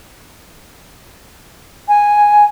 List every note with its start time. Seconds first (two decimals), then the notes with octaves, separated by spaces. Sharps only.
1.88 G#5